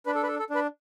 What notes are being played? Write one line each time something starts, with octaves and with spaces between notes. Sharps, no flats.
D4 B4
A4
B4
A4
A4
D4 B4